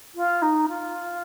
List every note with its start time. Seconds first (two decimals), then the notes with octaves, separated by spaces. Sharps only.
0.15 F4
0.42 D#4
0.68 F4